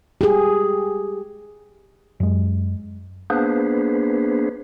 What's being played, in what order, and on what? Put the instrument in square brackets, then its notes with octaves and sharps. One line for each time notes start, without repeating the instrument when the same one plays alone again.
[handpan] G4 G#4
[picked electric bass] F#2 G#3
[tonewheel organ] A#3 B3 D4 G#4 B4 C5